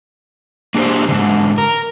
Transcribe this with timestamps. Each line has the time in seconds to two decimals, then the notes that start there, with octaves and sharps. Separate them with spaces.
0.74 A#3 D4 G4 G#4 C5
1.09 G#2 D3
1.58 A#4